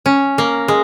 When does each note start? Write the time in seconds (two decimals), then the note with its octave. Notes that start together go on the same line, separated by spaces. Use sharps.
0.06 C#4
0.38 A#3
0.68 G#3